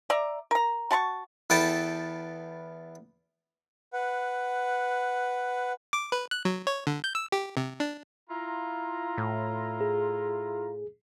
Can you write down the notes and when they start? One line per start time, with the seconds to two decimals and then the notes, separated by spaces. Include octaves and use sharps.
0.10 D5 E5 A#5
0.51 A#4 A#5
0.91 F#4 A5 B5 C#6
1.50 E2 B3 A4 G5 A5
3.93 B4 F#5
5.93 D6
6.12 B4
6.31 F#6
6.45 F#3
6.67 C#5
6.87 D3
7.04 G6
7.15 E6
7.32 G4
7.57 C3
7.80 D4
8.30 E4 F4 A#5
9.18 A2
9.81 G#4